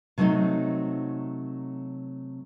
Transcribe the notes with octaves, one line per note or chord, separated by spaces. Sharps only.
C3 F#3 A3 C4 D#4